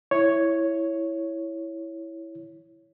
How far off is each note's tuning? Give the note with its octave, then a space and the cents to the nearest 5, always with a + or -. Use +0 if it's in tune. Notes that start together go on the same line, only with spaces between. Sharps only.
E4 +0 C#5 +0